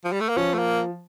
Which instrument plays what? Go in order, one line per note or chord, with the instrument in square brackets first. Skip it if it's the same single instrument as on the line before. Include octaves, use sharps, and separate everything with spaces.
[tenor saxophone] F3
G3
A3
A#3
[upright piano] F3 [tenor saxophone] C#4
[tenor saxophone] A3
A#3